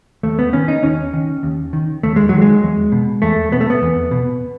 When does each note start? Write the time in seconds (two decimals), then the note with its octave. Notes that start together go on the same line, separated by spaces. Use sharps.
0.23 D#2 A3
0.39 B3
0.53 D#3 C#4
0.68 D#4
0.83 D#2 C#4
1.13 D#3
1.43 D#2
1.73 D#3
2.03 D#2 A3
2.16 G#3
2.29 D#3 F#3
2.42 G#3
2.63 E2
2.92 B2
3.22 E2 A3
3.52 B2 B3
3.61 A3
3.70 B3
3.82 E2
4.11 B2